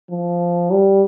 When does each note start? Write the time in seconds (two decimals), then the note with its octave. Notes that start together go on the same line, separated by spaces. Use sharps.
0.10 F3
0.71 G3